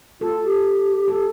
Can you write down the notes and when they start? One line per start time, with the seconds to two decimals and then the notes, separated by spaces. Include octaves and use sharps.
0.21 F4 A4
0.43 G4
1.08 A4